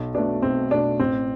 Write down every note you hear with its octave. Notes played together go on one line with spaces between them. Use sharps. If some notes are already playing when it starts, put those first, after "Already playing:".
Already playing: B1
B2 A3 D4
B1 C4
B2 A3 D4
A1 C4